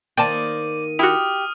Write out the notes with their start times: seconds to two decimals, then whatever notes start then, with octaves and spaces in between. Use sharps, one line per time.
0.17 D#3 A#3 C5 D5 G5 A5 D#7
0.99 E4 F#4 G4 D#6 F6